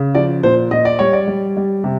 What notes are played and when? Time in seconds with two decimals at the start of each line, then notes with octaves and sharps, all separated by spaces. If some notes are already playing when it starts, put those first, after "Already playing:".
Already playing: C#3
0.15 F3 D5
0.43 A#2 C5
0.71 A#2 D#5
0.85 D5
0.99 G3 C#5
1.13 D5
1.28 G3
1.57 G3
1.84 C3